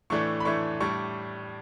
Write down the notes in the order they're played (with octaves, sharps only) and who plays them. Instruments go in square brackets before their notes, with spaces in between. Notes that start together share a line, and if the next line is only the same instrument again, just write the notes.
[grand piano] A2 E3 A3 D4 C#6
B5
A2 E3 A3 D4 C#6
A2 G3 D4 C#6